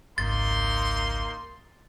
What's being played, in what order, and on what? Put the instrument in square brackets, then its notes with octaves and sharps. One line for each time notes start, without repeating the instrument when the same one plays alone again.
[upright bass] G#1 C#2 [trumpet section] A#3 D#4 C6 [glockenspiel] A6